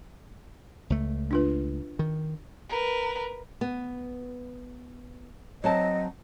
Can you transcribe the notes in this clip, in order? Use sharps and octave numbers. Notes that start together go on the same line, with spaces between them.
C#2 A3
D4 F4 B4
D#3
A#4 B4
B3
F#3 C4 D#5 A5